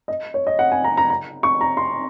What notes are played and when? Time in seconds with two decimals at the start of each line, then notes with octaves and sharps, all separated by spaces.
0.08 D#5
0.34 C#5
0.47 D#5
0.59 F#5
0.71 G#5
0.84 A#5
0.97 A#5
1.10 A#5
1.43 C#6
1.61 A#5
1.77 C6